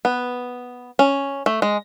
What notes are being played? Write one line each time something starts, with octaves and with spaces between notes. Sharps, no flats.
B3
C#4
A3
G#3